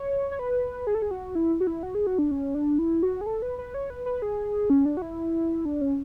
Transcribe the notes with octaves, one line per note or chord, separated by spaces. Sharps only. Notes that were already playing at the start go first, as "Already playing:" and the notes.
Already playing: C#5
C#5
B4
G#4
A4
G#4
F#4
E4
F#4
E4
F#4
G#4
F#4
D4
C#4
D4
E4
F#4
G#4
A4
B4
B4
C#5
B4
B4
G#4
C#4
D4
F#4
E4
D4
C#4